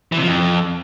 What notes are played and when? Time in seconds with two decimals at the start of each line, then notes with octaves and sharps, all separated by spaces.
0.12 E3
0.17 C3
0.23 F3
0.28 F2